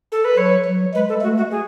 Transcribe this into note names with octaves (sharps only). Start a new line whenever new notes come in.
A4
B4
F#3 C#5
F#3
G#3 B4
A4
A3 F#4
F#4
G#4